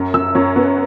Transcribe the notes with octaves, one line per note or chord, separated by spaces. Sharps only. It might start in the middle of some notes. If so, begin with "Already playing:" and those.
Already playing: F#2
F#2 E6
F#2 C#5
B3